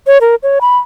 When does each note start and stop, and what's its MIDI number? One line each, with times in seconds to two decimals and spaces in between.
0.07 0.18 73
0.21 0.35 70
0.43 0.59 73
0.61 0.78 83